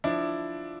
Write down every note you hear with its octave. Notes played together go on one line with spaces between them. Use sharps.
F3 D4 E4